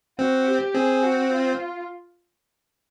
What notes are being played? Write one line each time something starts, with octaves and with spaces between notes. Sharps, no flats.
C4 F#4
G4
C4 G#4
F#4
F4